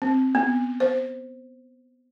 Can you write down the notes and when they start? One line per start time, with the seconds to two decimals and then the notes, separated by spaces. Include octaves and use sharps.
0.02 C4
0.35 B3
0.80 C5